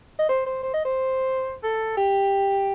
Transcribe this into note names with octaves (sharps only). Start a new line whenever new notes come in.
D#5
C5
C5
C5
D#5
C5
A4
G4